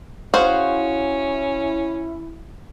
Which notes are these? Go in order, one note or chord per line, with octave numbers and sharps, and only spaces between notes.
C#4 E4 F#4 G#4 C5 F5